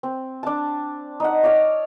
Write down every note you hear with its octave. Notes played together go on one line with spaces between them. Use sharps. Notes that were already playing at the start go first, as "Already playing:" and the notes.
C4
D4 A5
D#4 F#5
C#5 D5 F5